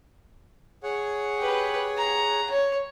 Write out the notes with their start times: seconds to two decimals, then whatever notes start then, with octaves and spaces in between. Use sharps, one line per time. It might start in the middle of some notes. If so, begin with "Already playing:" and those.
0.83 G#4 C#5 F#5
1.39 G4 B4
1.98 A#5
2.50 C#5